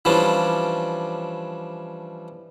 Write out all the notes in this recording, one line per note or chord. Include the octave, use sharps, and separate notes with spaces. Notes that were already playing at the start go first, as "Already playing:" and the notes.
E3 F3 G3 C#4 D4